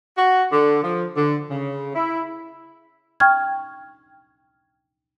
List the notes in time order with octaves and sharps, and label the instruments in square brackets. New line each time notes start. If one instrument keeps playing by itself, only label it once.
[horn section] F#4
D3
F3
D3
C#3
E4
[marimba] G5 C#6 F6 G#6